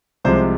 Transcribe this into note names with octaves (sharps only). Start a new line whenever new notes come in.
C2 C3 F3 G#3 C5